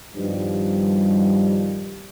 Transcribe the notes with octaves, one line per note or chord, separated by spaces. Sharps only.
G2 B2 D#3 F3 G3